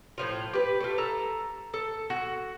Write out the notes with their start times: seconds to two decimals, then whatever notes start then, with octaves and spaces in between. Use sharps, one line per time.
0.18 A2 F3 F4
0.53 G4 B4
0.80 A3 F4
0.98 A4 A#5
1.74 A4
2.10 F#4